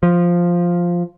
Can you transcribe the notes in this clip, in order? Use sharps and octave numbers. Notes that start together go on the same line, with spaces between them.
F3